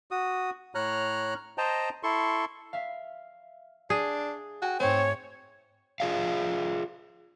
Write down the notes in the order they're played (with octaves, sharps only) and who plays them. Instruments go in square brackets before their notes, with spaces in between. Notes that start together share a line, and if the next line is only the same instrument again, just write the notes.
[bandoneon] F#4 D#6
A2 C#5 A#5 F6 F#6
C5 D#5 G5 A5 A#5
E4 A4 C6 C#6
[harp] E5 F5
[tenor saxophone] D4 [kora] G#4
[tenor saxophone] F#4 [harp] G5 G#5
[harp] G#2 A3 [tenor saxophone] C4 [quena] C#5
[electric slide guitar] F4 G#4 D5 F5